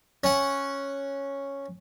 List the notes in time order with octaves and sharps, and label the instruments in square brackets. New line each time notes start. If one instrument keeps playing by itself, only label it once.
[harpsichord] C#4 F#5